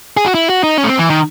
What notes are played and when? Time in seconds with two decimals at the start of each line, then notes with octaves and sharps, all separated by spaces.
0.17 G#4
0.26 F#4
0.34 E4
0.49 F#4
0.63 D#4
0.78 C#4
0.84 A3
0.88 C4
0.99 E3
1.10 D#3